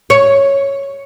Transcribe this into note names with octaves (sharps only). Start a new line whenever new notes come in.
C#5